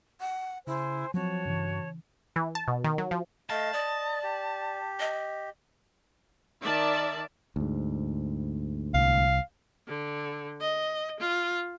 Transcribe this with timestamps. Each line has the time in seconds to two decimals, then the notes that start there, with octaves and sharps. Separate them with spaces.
0.20 F#5
0.67 C#3 E4 C5 G#5
1.14 F3 F#3 C4 F#4 C#5 A5
1.45 G2 C#3 E3
2.36 E3
2.55 A5
2.68 B2
2.84 D#3
2.98 F#3
3.11 F3
3.50 A3 D#5 F5 A5
3.73 D5 D#5
4.24 G4
5.00 D#5
6.62 D#3 D5 E5 A5
7.56 D2 G#2
8.94 C2 F5
9.88 D3
10.61 D#5
11.20 F4